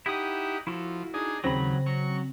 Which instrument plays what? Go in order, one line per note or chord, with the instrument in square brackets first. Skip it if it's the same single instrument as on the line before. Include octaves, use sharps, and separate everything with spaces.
[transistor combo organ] D#4 G4 F#5 [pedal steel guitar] E4 D#6
[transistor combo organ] F3 [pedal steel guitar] E4 F#4 A4
[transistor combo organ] D4 D#4 G#4
[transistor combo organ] D#2 [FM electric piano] C#3 C4 A#6 [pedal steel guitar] F#3 B5
[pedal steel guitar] F#3 [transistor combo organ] C#6